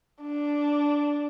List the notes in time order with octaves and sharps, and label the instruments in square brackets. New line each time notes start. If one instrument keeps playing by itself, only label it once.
[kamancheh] D4